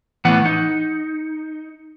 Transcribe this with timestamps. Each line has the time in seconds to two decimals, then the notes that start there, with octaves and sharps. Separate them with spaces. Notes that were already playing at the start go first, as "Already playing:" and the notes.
0.25 A2 E3 B3 F#5
0.46 D#4